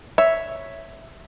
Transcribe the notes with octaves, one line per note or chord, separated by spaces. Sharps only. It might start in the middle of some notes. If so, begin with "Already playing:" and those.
C#5 E5